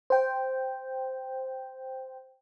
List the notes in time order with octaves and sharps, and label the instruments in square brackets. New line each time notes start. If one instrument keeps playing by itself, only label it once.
[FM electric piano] C5 G5